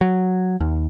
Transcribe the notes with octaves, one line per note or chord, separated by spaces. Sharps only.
F#3
D#2